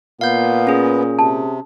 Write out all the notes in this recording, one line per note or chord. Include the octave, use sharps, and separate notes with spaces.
A#2 B3 F5 G6
C#4 G#4
C3 A5